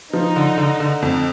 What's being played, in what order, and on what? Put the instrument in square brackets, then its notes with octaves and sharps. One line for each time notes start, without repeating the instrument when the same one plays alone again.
[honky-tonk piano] F3 [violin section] D#4
[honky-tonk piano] D3
D3
D3
F2